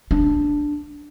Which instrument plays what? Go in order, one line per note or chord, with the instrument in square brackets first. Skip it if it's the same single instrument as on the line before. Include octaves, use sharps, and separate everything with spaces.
[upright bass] D4